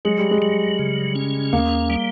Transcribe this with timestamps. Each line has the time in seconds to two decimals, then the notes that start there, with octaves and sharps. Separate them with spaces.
0.05 F#3 G#3
0.18 G3
0.31 G#3
0.42 F#3
0.79 C#3
1.15 C#4
1.53 D#2 A#3
1.90 G3